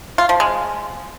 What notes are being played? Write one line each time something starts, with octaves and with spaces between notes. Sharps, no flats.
F4
F3
G#3